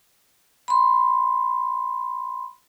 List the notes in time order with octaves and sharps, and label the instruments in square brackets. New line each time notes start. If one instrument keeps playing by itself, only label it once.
[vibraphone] B5 C6